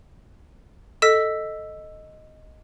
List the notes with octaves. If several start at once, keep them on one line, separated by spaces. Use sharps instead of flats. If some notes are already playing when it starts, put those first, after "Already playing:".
A4 D#5 E6 B6